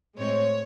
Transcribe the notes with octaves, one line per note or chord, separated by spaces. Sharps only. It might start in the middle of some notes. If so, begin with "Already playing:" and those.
A2 G#3 C4 C#5